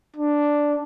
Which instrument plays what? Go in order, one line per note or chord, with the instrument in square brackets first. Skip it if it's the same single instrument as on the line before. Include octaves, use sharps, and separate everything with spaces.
[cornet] D4